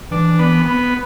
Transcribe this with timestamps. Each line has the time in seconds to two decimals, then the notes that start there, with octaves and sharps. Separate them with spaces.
0.11 E3 D4
0.39 B3
0.66 B3